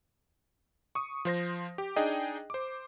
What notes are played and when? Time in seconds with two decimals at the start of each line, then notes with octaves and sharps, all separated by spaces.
0.95 C#6 D#6
1.25 F3 C5 A#6
1.78 G4
1.96 D4 D#4 G#4 D#5 G5
2.50 C5 D6